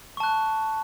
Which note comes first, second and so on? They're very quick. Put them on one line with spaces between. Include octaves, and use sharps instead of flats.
C#6 A5 F#6